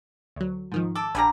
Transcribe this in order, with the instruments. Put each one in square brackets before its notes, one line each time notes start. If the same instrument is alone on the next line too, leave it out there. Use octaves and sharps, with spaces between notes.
[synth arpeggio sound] D2 F#3
G#2 D#3 F3
[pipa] A4 [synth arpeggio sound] D6
[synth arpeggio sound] A#1 G#5 B5 [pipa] D3 G3 A#5